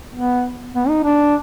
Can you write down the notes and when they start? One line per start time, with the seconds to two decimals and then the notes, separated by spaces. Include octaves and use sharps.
0.15 B3
0.74 B3
0.89 D#4
1.04 D4